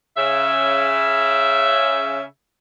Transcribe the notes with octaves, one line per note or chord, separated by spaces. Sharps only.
C#3 E5